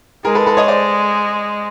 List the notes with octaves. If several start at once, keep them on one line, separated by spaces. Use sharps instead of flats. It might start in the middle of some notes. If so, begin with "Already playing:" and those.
G#3 G#4 A#4
A4 B4
A4 B4
C#5 D#5
C5 D5